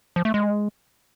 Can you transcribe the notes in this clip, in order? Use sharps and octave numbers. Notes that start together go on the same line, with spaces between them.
F3
A3
G#3